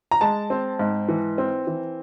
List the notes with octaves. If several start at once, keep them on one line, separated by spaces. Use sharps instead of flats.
A#5
G#3 A5
C4
G#2
E3
C4
E3